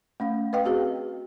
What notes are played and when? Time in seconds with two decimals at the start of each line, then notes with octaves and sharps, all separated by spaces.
0.20 A3 C#4 F5
0.53 B4 D#5 F5 G5
0.65 C4 F#4 G#4 D#5